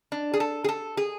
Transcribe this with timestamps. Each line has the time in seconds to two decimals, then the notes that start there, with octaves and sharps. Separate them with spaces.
0.12 D4
0.34 G#4
0.40 A4
0.64 G#4
0.69 A4
0.97 G#4